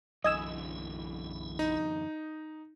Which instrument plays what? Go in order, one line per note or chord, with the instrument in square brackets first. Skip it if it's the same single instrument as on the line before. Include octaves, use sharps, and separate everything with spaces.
[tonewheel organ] B1 E4 [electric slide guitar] F#2 D3 E3 [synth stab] D#5 G#5 E6
[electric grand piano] D#4